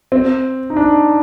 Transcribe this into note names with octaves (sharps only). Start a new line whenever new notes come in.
C4
D#4
D4